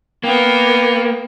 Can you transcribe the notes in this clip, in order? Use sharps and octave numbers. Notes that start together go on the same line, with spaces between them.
A#3 B3 G5